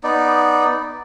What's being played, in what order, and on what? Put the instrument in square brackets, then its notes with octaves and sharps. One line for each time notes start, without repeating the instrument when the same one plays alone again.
[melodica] B3 D#4 D5